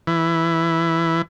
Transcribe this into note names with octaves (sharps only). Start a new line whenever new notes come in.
E3